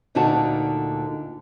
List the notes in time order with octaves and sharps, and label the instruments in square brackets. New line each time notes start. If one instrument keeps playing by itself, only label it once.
[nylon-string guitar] D2 A#2 D3 D#4 F#4 A5